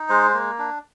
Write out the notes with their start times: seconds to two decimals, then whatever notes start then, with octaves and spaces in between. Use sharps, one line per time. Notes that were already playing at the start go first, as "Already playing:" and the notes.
Already playing: D#4
0.09 G#3 C5
0.34 A#3
0.59 D4